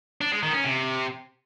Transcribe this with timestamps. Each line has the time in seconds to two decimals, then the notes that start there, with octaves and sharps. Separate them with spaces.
0.21 D4
0.32 G#3
0.43 D#3
0.54 C#4
0.64 C3